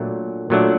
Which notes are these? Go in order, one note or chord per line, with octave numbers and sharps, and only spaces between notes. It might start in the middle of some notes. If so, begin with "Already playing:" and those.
Already playing: A#2 F#3 A3 D4
A#2 F#3 A3 D4